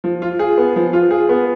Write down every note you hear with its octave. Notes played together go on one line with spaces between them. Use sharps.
F3
F4
G#4
B3
F3
F4
G#4
B3